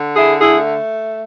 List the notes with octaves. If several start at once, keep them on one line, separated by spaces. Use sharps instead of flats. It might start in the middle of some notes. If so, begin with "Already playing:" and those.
Already playing: D3
E4 G#4
A3 E4 G#4